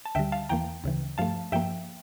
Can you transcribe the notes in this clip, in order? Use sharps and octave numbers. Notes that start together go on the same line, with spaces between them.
A5
D2 D3 G3 E5 G5
F5 A5
E2 E3 A#3 G5 A#5
D2 C#3 E3
G2 F3 A3 F5 A5
G2 F3 A#3 E5 G5